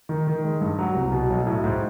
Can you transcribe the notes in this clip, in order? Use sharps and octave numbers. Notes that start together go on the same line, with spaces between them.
D#3
D#3
G#3
G2
F#3
C2
B2
B1
A2
G#2